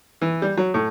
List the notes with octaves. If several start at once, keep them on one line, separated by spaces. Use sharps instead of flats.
E3
G3
F#3
A2